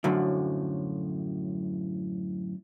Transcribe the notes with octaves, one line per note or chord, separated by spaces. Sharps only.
F#2 A2 D3 F3 F#3